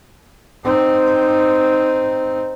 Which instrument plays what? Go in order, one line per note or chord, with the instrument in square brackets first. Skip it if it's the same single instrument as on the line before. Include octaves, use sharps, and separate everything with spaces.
[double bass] C4 D#4